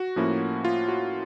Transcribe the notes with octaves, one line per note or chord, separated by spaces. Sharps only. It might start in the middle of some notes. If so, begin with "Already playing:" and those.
Already playing: F#4
A2 F3 A#3 C#4 E4
F4
F#4